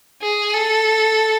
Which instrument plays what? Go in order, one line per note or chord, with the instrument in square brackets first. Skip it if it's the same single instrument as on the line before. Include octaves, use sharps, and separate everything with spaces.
[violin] G#4
A4